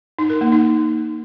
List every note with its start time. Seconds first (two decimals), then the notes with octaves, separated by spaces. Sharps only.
0.19 D#4
0.30 A#4
0.41 A#3
0.52 D#4